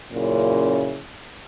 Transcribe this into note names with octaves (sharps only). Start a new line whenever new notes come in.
F#2 A#2 C#3 E4